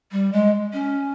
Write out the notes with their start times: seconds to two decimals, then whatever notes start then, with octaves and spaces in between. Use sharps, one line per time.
0.12 G3
0.32 G#3
0.73 C#4